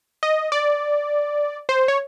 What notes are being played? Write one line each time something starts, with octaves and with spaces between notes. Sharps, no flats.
D#5
D5
C5
C#5